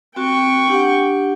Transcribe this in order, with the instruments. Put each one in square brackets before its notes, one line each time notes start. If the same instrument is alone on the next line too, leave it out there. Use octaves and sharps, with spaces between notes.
[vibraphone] C4 F#4 [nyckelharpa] G5 C#6
[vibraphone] D4 G4 F#5